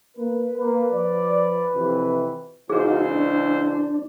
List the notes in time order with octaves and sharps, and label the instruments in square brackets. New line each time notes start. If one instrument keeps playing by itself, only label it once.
[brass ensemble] A#3 A#4 B4
[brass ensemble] A#3 [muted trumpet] B4
[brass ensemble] F3 D5
F2 C3 E3
[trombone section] C#2 E3 C5 [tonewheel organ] D#4 F4 F#4 [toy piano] G#4 A#4
[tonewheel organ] D4